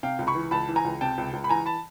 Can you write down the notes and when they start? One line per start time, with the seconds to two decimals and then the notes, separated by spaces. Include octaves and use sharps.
0.03 C3 F5 G5
0.19 C#2
0.27 B5 C#6
0.35 E3
0.51 C#2 A5 B5
0.68 E3
0.76 G#5 A#5
0.85 C#2
1.01 C3 G5 A5
1.18 C#2
1.33 C#2
1.44 B5
1.49 E3 G#5 A#5
1.66 A5 B5